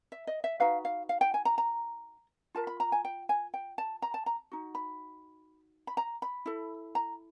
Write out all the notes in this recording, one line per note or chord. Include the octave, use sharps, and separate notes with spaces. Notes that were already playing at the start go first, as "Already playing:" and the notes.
E5
D#5
E5
D#4 F#4 B4 F5
F5
F5
G5
G#5
A#5
A#5
F4 A#4 A5
B5
A#5
G#5
G5
G#5
G5
A5
A#5
A5
A#5
D#4 F#4
B5
B5
A#5
B5
E4 A4
A#5